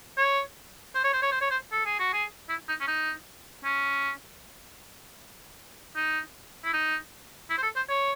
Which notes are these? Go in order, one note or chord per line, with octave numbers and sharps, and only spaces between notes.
C#5
C5
C#5
C5
C#5
C5
C#5
C5
A4
G#4
F#4
G#4
E4
D#4
C#4
D#4
C#4
D#4
E4
D#4
E4
C5
A4
C5
C#5